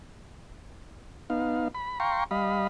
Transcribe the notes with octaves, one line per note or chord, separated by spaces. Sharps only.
B3 D#4 F5
B5
F5 G5 A#5 C6 C#6
G3 D#5 F5 B5